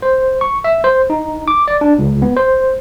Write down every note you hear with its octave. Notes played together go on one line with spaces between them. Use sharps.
C5
C#6
E5
C5
D#4
D6
D5
D4
C#2
B3
C5